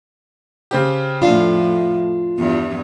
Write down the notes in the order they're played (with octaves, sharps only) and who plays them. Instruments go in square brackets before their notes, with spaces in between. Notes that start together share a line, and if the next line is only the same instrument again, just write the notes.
[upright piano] C#3 C4 G4
[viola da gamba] F2 A2 [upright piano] D4 [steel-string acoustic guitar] F4 F5
[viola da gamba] E2 G2